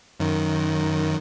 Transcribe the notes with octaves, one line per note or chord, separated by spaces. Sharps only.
F#2 D#3